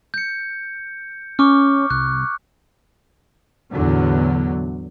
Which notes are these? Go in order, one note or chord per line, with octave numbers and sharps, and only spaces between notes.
G6 C#7
C#4 C#6 D6 F6
C2 F#6
E2 A2 D3 F#3